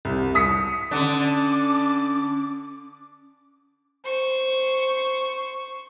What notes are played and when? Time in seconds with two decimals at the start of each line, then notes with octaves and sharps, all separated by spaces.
0.05 C2
0.35 D#6 B6 C#7
0.91 D3 C#4 D4 D6
4.04 C5 C#6